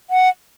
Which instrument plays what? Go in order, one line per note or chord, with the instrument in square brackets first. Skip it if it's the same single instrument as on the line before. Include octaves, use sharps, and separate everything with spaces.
[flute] F#5